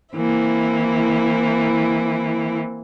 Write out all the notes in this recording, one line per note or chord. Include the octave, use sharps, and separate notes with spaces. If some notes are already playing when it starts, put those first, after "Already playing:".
E3 A#3 C4 E4